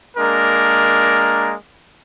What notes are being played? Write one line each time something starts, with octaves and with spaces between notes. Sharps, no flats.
G#3 A#3 D4 A#4